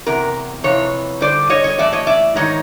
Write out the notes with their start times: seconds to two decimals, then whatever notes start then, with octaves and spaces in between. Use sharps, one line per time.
0.06 E2 C3 A#4
0.64 F2 C3 E3 C#5
1.21 G2 D3 C5 D5
1.50 C#5 D#5
1.64 C#5 D#5
1.78 A2 E3 D5 E5
1.93 C#5 D#5
2.07 D5 E5
2.36 G#2 D#3 C#5 D#5